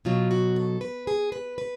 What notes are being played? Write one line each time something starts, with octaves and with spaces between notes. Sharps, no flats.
B2 F#3 F4
F#4
A4
B4
G#4
B4
B4